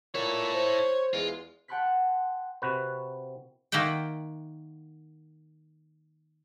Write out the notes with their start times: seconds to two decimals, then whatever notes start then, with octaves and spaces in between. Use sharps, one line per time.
0.15 A#2 E4 A4 C#5
0.54 C5
1.13 E2 G#3 F4
1.68 F#5 G5 A5 C6 F#6 B6
2.62 C3 F#4 B4
3.72 D#3 A#3 E5 F#5 G5